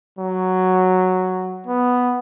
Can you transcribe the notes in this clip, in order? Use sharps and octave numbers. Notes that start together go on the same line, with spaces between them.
F#3
B3